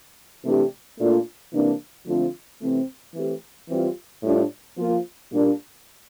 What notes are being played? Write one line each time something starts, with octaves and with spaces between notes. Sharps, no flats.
C3 E3 A3 D4 G4
A#2 A3 D4 F4
C3 E3 A#3 D4
D3 F3 A3 C4 F4
C3 E3 A3 C4
E3 A3 C4 G4
E3 G3 C4 F4
A2 G3 D4 F4
F3 A#3 F4
A#2 G3 A#3 D4 G4